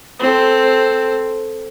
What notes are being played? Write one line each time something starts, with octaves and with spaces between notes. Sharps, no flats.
C4 A4